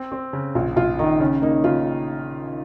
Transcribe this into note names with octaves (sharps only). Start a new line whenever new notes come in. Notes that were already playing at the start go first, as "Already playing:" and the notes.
Already playing: C4
C4
C#3
A#1 F4
A#1 F4
D#3 D#4
C#3 C#4
A#3 D#4
C#3 F4